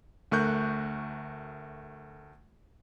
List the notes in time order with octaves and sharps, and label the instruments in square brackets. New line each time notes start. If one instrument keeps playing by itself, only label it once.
[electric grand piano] D2 A3 A#4 C#6 F#6 G6